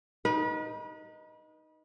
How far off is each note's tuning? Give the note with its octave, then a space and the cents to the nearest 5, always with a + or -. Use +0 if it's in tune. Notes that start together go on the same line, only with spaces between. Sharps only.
D#4 +0 B4 -35